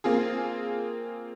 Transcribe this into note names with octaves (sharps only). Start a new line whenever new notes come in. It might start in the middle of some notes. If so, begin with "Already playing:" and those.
A#3 C4 F4 G#4